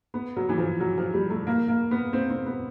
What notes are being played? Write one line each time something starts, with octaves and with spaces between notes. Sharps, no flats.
B3
F#3
E3
F3
F#3
F3
G3
A3
A#3
A#3
B3
C4
C4
B3